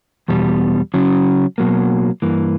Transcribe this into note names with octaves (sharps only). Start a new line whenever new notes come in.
E2 B2 G3
C#3 F#3 C#4
B2 F#3 A#3
G2 E3 A#3